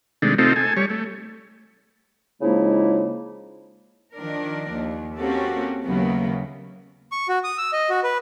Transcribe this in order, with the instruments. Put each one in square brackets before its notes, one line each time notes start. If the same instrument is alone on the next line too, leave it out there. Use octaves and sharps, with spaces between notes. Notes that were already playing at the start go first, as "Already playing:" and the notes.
[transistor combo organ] C3 D#3 G#3 A3 D4
C3 A3 C4 D#4 F4 A4
A4 G#5
G3 C#5
A3
[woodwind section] C#3 F3 G#3 A#3 D#4 E4
[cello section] D#3 F3 D4 A#4
D#2
A#3 C4 C#4 F#4 G4 A4
D#2 C#3 E3 F#3 A#3 B3
[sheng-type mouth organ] C#6
F#4
D#6
E6
D#5
F#4
B4